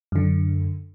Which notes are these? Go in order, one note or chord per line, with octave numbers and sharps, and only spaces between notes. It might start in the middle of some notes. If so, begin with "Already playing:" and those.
F#2 D3